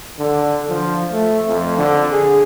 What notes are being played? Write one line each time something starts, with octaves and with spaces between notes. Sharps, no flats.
D3
F3
A3
F2
D3
G#4